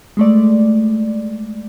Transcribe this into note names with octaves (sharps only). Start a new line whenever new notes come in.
G#3 A3 D5